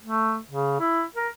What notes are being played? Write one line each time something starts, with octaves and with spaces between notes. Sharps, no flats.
A3
C#3
E4
A#4